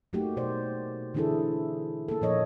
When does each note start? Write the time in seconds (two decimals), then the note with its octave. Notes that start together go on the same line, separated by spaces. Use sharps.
0.13 F#3 A3 A#3 D#4 F#4 G4
0.37 B2 C5 D5
1.14 D3 E3 D4 E4 G#4 A4
2.08 A#3 A4
2.22 A#2 F3 C#5 D#5